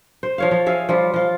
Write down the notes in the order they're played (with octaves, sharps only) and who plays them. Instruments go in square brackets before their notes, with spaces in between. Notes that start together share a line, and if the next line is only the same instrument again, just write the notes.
[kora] C5
F3 C#5 F5
F3
G#4 E5 F5
F3 G3 F4
F3 F4